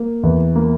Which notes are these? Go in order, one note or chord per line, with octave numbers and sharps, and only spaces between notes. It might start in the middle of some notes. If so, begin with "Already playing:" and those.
Already playing: A#3
E2
A#3